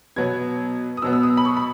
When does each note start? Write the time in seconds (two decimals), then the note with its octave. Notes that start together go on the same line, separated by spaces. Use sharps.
0.16 B2 F#3 B3 G#6
0.97 D#6
1.02 B2 F#3 B3 E6
1.13 E6
1.23 D#6
1.37 B5
1.45 C#6
1.57 B5